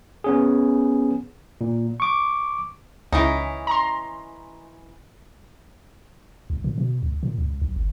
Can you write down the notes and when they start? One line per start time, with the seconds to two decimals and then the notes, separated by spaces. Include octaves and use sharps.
0.24 B3 C#4 G#4
1.61 A#2
2.00 C#6 D6
3.13 C#2 E3 C#4 D#4
3.67 A#5 C6
6.50 C2
6.64 A#2
6.78 B2
7.03 C#2
7.23 A#2
7.38 C#2
7.62 B1
7.76 G1